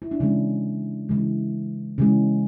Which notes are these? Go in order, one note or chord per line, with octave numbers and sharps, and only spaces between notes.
E4
D4
C#3 E3 G#3 C#4
C#3 E3 G#3
C#3 E3 G#3 C#4